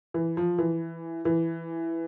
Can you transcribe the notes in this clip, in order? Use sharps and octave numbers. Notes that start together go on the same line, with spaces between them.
E3
F3
E3
E3